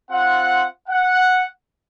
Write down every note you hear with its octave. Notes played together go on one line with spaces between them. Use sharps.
C4 F4 F#5
F#5